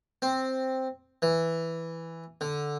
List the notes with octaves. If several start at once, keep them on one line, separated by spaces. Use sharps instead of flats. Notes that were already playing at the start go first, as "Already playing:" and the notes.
C4
E3
D3